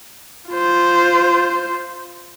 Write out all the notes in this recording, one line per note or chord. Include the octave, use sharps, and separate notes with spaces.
F4 C5